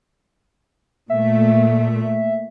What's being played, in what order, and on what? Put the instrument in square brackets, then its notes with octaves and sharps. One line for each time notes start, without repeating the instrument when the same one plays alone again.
[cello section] A#2 A3 [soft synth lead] E5